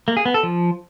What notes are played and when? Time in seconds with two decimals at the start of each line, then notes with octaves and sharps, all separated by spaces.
0.08 A#3
0.17 G#4
0.26 B3
0.34 A4
0.43 F3